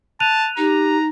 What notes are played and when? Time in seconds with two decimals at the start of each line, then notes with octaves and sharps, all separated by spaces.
0.20 A5 F#6 D#7 F7
0.58 D#4 G4 A#5